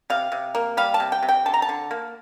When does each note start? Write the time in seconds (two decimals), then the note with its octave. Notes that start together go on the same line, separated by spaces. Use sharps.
0.10 C3 F5
0.32 C3
0.55 A#3
0.77 G3 F5
0.94 A5
1.00 C3
1.12 G5
1.23 C3
1.28 G5
1.45 D3 A5
1.54 A#5
1.62 A5
1.69 D3
1.91 A#3